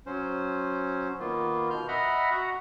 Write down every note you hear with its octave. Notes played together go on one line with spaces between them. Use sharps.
F#3 C#4 C5
D#3 A#3 B3 F4
B2 F6 G6
D#5 E5 F#5 A#5 B5 F6
F#4 F#5 A#5